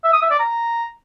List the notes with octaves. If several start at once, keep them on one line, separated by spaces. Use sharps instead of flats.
E5
D#6
E5
D5
A#5